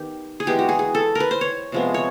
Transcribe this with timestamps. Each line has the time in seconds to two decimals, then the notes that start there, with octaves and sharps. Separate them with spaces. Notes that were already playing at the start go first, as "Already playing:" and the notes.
Already playing: D#3 B3 G4
0.40 G#4
0.47 E3 G#3 B3 G4
0.59 F#4
0.69 G#4
0.79 G#4
0.95 A4
1.15 A#4 B4
1.31 C5
1.41 C#5
1.72 C3 F3 G#3 B3
1.94 C#5